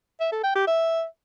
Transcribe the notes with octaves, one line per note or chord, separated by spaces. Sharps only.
E5
A4
G5
G4
E5